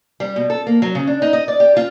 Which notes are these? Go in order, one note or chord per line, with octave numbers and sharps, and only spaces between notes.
G3
B2
A4
A#3
F#3
C#3
D4
D#4
D#5
D5
G4
F4